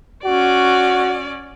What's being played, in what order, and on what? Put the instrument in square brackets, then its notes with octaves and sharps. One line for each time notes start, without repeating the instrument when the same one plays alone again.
[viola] C#4 D5 [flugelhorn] F#4